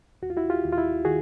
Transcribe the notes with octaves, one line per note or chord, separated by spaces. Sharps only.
D#2 F#4
F4
E4 F#4
F4 G4
D#2
F4
E4
D#3 F#4 G#4